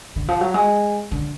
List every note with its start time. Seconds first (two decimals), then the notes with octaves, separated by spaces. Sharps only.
0.16 D3
0.28 F3
0.41 F#3
0.54 G#3
1.11 D3